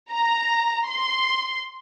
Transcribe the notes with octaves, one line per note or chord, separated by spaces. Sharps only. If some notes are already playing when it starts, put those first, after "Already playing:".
A#5
C6